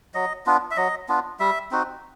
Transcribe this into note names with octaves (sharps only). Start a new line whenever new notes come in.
F#3 D#5
B3 D4 F4
E5
F#3 D#5
B3 D4 F4
G3 E5
C4 D#4 F#4